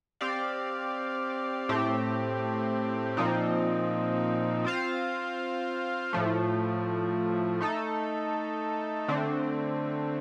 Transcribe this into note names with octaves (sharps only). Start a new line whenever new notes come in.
C4 G4 D5 F5
A2 A3 C4 G4
A#2 F3 C4 D#4
C4 F4 C5 F5
A2 F3 A3
A3 D#4 A4
D3 A3 C4